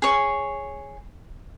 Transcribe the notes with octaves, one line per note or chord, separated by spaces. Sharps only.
G#4 C#5